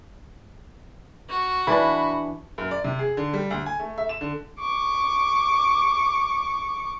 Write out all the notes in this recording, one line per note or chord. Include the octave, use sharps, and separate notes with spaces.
F#4
E3 D4 B5
F#2
D5
C3
G#4
D3
G3
D2
G#5
A3
E5
E7
D3
C#6 D6